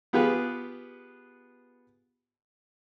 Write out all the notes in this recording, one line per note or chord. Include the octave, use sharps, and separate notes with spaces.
B3 F4 G4 G#4 B4